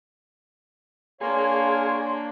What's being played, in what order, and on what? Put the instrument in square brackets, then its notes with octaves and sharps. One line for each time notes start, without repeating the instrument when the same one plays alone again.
[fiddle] A#3 D4 [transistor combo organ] G#4 [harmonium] C#5 F5 [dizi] C6